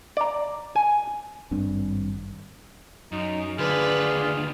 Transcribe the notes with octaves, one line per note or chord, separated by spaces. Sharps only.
D5 A#5
G#5
G#1 G2 C4 D4
F#2 D#4
D#2 D3 F4 G#4 B4 D5